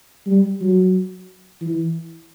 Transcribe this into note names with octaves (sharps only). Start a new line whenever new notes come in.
G3
F#3
E3